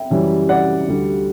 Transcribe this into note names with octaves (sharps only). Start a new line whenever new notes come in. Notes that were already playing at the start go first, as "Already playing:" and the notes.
Already playing: E5 G5
F#2 C#3 E3 G3
D5 F#5
D2 D3 G3